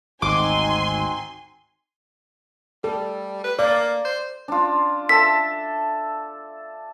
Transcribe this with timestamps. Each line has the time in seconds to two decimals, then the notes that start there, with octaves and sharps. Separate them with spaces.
0.22 G#1 D2 C4 D#4 F#4 G#5 C6 D6
2.84 G3 A4
3.44 B4
3.59 A#3 D5
4.05 C5
4.48 D4 F4
5.09 A4 E5 A5 B6